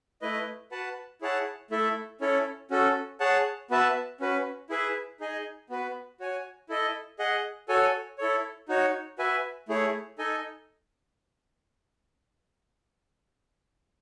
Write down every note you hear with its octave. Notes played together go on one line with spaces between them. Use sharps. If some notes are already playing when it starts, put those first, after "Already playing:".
A3 E4 B4 D#5
F#4 B4 F#5 A5
E4 G#4 C#5 F#5 A5
A3 E4 A4 E5
C#4 E4 A4 C#5
C#4 F#4 A4
G#4 C#5 F#5 A5
B3 F#4 B4 E5 A5
C#4 F#4 B4
E4 G#4 B4 E5
D#4 G#4 D#5 G#5
B3 F#4 B4
F#4 C#5 G#5
E4 A4 D#5
G#4 D#5 F#5
F#4 A4 C#5 G#5
E4 A4 C#5
D#4 F#4 C#5
F#4 B4 E5 G#5
A3 E4 G#4 C#5
D#4 A4 D#5 G#5